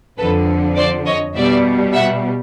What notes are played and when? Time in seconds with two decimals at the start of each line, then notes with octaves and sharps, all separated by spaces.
0.18 F2 D3 F3 A4 B4
0.76 C5 D5
1.06 C#5 D#5
1.35 B2 G3 D5 E5
1.94 E5 F#5